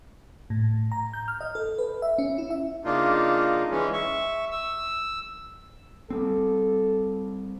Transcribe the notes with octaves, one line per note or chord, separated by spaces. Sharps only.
A2
A#5
G6
F6
D#5
A4
B4
E5
C#4
E4
E5
C#3 A#3 D4 D#4 F4
E3 G#3 C#4
E5 C#6
E6
G3 B3 C4 A4